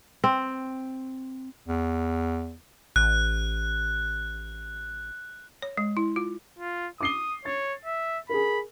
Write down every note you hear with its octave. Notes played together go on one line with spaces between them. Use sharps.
C4
E2
A1 F#6
C#5
G#3
E4
F4
F4
D6 D#6 C7 G7
C#5 A6
E5
G#4 A#4 B5